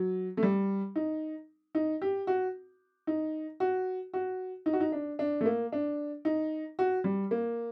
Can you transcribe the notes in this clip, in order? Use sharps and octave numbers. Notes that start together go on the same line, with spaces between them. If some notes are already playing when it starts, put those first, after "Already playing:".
Already playing: F#3
A3
G3
D#4
D#4
G4
F#4
D#4
F#4
F#4
D#4
F#4
D#4
D4
D4
A3
A#3
D4
D#4
F#4
G3
A#3